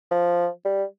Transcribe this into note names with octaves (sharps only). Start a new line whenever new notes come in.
F3
G3